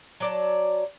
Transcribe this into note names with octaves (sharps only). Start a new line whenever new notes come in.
F#3 D5 A5